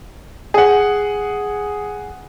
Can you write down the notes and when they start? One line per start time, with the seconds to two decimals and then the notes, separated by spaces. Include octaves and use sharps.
0.54 G#4 F#5